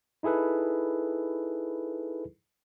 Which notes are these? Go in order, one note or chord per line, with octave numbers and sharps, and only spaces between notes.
D#4 E4 G#4 A4 B4